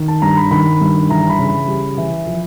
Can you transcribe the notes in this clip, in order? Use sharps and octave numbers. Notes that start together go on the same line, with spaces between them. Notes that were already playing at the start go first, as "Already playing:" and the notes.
Already playing: D#3
A5
G2 A#5
B5
D#3 B5
G2
E3 A#5
B5
C#3
B5
G3
E3
F3